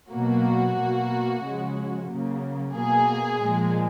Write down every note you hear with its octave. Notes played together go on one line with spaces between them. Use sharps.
B2 F#3 A#3 F#4
B2 A#3
C#3 F3 G#3
C#3 F#3 A#3
B2 A#3 G#4
A#2 F3 G#3